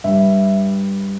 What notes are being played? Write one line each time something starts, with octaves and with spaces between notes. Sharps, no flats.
G2 G3 E5